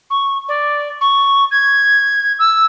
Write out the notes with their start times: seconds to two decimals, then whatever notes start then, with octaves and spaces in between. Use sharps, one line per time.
0.10 C#6
0.48 D5
1.01 C#6
1.51 G#6
2.39 E6